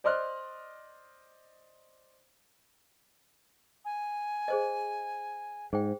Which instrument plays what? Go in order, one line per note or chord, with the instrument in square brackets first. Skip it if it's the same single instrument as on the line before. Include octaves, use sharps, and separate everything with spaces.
[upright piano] C5 D5 D#5 C6 F6 F#6
[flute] G#5
[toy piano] G#4 C5 D#5
[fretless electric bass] G#2 [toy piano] G#4 C5 G5